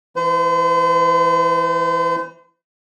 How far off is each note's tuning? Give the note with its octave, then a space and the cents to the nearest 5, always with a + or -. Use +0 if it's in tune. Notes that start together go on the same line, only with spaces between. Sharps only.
E3 +0 C5 -40